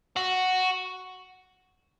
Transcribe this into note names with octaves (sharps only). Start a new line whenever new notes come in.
F#4